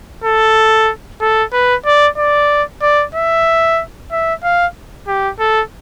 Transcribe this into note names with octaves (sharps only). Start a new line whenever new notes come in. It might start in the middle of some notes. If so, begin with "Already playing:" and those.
A4
A4
B4
D5
D5
D5
E5
E5
F5
G4
A4